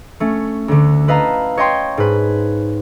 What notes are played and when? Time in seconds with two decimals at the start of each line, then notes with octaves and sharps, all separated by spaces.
0.20 A3 C#4
0.68 D2 D3
1.08 E4 B4 D#5 F5 A5 A#5
1.57 C#5 D#5 G5 C6
1.97 G#2 B4